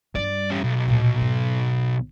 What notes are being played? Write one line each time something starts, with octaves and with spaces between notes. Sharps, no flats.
G2 G3 D5
C#4 G4
B1
D2 A#2
G#2